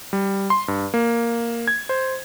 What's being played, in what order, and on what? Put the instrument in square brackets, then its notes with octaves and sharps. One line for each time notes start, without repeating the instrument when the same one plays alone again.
[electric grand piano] G3
C6
G2
A#3
G#6
C5